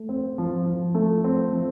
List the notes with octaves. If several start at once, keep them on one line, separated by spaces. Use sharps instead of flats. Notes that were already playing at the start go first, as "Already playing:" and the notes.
Already playing: A3
C4
F3
F3
A3
C4
F3